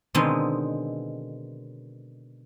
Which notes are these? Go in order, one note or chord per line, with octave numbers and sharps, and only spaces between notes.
B2 D3 D#3 G#3 B3 C4